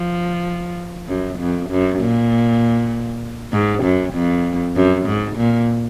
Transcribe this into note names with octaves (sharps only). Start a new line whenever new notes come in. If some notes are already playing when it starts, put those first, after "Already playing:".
Already playing: F3
F#2
F2
F#2
A#2
G#2
F#2
F2
F#2
G#2
A#2